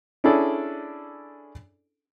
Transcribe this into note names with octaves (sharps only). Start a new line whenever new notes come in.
C#4 D4 E4 G#4 A4 D5